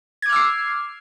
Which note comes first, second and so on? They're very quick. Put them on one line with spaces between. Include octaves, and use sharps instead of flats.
G#6 D6 F6 E6 C7